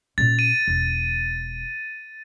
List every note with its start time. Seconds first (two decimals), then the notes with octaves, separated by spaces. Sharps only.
0.18 A#2 C#4 A6
0.39 D#7
0.67 E1